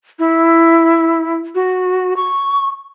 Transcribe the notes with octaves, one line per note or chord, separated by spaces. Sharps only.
E4
F#4
C#6